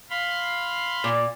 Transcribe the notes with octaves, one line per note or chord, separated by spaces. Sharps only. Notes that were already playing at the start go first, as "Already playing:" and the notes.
F5 B5 C6
A#2